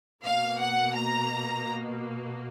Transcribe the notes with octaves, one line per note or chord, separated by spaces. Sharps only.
B2 A#3 F5
F#5
A#5